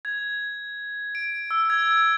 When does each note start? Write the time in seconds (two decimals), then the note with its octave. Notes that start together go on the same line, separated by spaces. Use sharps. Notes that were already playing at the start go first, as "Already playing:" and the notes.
0.05 G#6
1.15 D7
1.51 E6
1.70 G#6